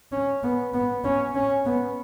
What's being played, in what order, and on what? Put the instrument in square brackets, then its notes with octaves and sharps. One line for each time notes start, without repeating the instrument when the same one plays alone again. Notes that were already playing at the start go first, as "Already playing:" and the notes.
[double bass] C#4
B3
B3
C#4
C#4
B3